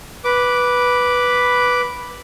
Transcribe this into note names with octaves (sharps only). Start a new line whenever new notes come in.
B4 D6